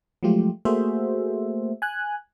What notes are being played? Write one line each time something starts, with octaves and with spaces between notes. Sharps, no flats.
F3 F#3 G#3 A3 F4 G4
A3 A#3 F#4 G#4 C5 E5
G#5 F#6